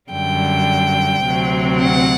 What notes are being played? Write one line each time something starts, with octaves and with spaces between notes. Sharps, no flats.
F#2 D3 G3 G5
D2 C3 F#3 C4
F#5